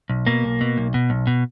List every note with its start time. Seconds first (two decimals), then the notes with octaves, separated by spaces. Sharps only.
0.09 B1
0.27 B2 A#3
0.44 B1
0.61 B2
0.78 B1
0.94 B2
1.10 B1
1.27 B2